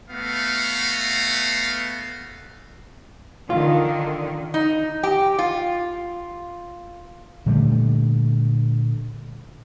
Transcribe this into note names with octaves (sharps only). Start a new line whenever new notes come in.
A3 B3 F#4 F5
D3 D#3 F4
D#4
G4
F4
A#2 D3 G3 A3